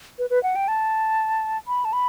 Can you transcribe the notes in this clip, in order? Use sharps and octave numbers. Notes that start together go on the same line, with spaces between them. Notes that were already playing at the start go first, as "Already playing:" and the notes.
B4
B4
F#5
G5
A5
B5
A5
B5